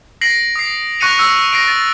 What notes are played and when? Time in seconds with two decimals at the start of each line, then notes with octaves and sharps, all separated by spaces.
0.21 A#6 C7 D7 F#7
0.56 D#6 C7
1.00 C#6 F#6 A#6 C#7 D#7 F7
1.19 E6
1.53 A#6 C7 D7
1.68 A6